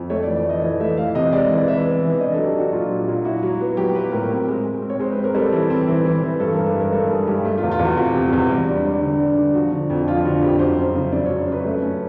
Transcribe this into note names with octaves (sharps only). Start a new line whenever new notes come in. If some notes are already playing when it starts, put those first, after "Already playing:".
Already playing: F2
A3 C#5
D5
E3
D5
A3 D#5
E3 D#5
A3 E5
E3 F5
C3 D#5
G#3 D5
E3
E3 E5
B3
E3
D4 D#5
A4
F#3
G4
D4
F#4
A#2 F4
F#3
A#2
E4 F#4
F#3
B3
F#3 G4
B3 B4
A2 A#4
C4
G#3
G#3
C4
C#5
G#3 C5
B4
C4
A#4
G3 A4
E3
C4
E3
E3
E3
G2 A4
A#4
G2
B4
G3 A#4
G2 A4
G2 G#4
G2 G4
A3
F4
E2
F4
E2
F#4
C3 F#4
C3
E2
G3
D4
G3
D3
D4
D3
F3 F#4
D3
F2
F3 F4
D3 F#4
F2 G4
F#2 C5
F#2
C#3
C#3 D5
F#2 C#5
F#2 B4
A3
C#4